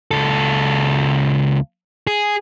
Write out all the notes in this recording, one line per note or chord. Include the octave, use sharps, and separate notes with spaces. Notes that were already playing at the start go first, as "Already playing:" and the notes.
C#2 A4
G#4